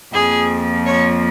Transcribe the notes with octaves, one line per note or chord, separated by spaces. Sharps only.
F2 F3 A#3 G#4
C#5